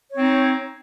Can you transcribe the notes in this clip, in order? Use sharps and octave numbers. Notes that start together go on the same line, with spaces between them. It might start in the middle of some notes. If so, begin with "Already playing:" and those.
C4 D#4 C#5